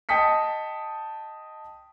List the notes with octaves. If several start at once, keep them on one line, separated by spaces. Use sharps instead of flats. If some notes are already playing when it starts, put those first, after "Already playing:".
D#5 G5 A5 D#6 B6 C#7